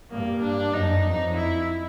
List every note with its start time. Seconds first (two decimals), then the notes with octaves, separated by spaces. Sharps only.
0.11 G2 A#3
0.42 D4
0.73 F#2 D#4
1.04 F2
1.35 E4